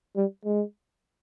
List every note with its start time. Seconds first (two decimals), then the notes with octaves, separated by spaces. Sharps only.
0.16 G3
0.45 G#3